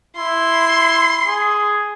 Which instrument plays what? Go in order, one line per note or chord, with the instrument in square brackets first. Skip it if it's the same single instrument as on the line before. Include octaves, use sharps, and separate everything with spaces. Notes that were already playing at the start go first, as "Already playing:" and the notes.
[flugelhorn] E4 [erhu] C6
[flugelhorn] G#4